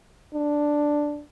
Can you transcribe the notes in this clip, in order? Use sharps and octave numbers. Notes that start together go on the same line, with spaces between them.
D4